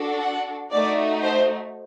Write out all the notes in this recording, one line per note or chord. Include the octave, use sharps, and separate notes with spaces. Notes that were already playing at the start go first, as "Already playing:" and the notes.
Already playing: D4 F#4 A4
F#5
A3 D#4 F#4 D5
C5